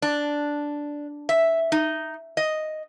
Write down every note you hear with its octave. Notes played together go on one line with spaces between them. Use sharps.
D4
E5
D#4
D#5